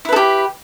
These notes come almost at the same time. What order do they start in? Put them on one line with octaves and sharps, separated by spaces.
E4 B4 A4 G4